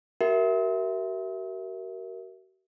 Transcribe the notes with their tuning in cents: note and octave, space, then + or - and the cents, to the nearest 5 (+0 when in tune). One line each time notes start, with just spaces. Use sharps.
F#4 +40 A#4 +0 E5 +0